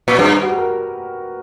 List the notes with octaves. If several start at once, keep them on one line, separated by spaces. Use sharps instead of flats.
A#2
G2 B4
F#4
G4
A#4